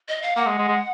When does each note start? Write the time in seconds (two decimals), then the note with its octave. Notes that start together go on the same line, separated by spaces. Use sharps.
0.08 D#5
0.22 F5
0.36 A#3 F#5
0.47 G#3
0.58 G#3
0.68 G#3